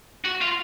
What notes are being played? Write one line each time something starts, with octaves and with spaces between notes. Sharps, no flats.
F#4
F4